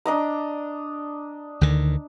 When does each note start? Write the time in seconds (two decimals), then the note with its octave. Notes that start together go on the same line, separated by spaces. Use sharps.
0.05 D4 D#5 A#5
1.61 D2 D3 D#3